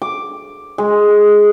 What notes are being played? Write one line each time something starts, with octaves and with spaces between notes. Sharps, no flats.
D6
G#3